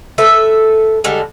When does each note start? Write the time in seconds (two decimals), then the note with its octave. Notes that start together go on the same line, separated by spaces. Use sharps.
0.18 A4 B4 E5
1.04 D3 G3 G#3 A4